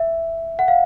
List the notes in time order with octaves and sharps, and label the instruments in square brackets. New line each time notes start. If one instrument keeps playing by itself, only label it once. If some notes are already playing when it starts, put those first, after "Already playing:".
Already playing: [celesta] E5
F#5
F5